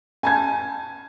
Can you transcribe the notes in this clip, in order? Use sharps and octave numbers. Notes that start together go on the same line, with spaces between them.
G#5 A5 G#6